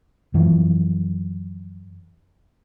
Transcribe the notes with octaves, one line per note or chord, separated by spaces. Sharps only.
F#2 E3 F3